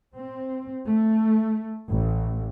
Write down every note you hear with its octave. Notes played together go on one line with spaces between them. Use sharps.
C4
A3
A1